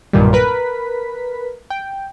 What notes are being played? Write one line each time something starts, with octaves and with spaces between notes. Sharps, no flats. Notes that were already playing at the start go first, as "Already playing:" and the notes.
B1 G2 A#2 D#3 G3
A#4 B4 B6
G5